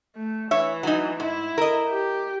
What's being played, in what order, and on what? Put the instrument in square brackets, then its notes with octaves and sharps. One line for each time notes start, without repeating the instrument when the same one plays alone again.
[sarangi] A3
[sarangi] E3 [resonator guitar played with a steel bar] C#5 E5
[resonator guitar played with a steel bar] F#3 D#4
[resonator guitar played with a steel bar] G#2 [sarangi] E4
[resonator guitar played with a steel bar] A#4 D#5
[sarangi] G4